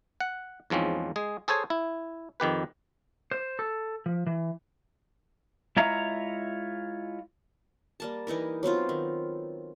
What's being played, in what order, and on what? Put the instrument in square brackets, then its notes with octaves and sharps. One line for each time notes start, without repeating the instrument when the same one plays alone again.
[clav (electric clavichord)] F#5
E2 G#2 F3 C4 C#4
G#3 G#4
G#4 A4 C5 C#5 G#5
E4
F2 D#3 G4 B4
[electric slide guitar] C5
A4
F3
E3
G#3 E4 F4 C#5 E5 A#5
[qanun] G3 A#3 A5
E3 D#4 E4 A#4
F#3 B3 C4 F4
D#3